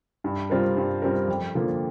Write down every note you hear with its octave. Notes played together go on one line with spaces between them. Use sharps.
G2
G3 C4 F4 A#4
G2
G3 C4 F4 A#4
F2
D3 F3 A#3 F4